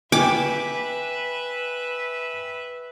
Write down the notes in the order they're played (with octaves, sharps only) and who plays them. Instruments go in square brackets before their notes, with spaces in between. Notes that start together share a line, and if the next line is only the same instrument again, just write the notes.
[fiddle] B4 E5 [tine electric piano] G5 G#5 [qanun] D6